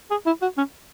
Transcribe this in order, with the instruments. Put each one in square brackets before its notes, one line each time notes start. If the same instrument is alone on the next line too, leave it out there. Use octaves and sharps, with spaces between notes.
[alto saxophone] G#4
E4
F#4
C#4